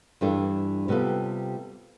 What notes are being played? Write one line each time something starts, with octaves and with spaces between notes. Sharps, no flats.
G2 E3 G3 D4 A4
C3 G3 B3 F4 A4